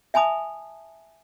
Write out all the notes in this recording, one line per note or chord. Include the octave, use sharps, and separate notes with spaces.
E5 G#5 A5 B5 D#6